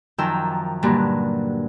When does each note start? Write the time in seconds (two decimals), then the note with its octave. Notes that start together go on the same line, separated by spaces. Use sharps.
0.18 F#2 D#3 F3 G5 E6
0.83 G2 A#2 D3 F#3